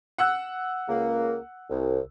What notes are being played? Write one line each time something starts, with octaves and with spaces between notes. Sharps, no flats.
F#5 E6 F#6
C#2 C#3 A#3
C2